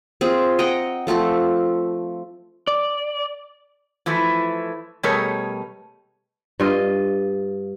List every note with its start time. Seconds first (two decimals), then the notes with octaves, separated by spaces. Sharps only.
0.21 C4 F4 G#4
0.59 D#5 F#5 G5 A#5
1.07 F3 A3 C4 A4
2.67 D5
4.06 E3 F3 A3 E4
5.03 B2 G3 A3 G#4 A#4 C#5
6.60 G2 F4 D#5